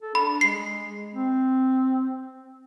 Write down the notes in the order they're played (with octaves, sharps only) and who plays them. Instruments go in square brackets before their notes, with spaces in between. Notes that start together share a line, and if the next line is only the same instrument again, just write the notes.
[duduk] A4
[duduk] D4 [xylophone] B5
[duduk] G#3 [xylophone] C7
[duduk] C4